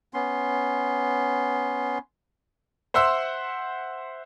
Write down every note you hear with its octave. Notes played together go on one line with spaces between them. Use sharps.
B3 C#4 C6
C5 E5 F#5 C6 E6